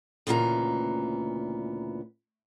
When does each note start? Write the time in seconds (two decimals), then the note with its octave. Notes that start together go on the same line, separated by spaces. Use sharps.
0.27 D2 A#2 C#3 E3 B3 A#5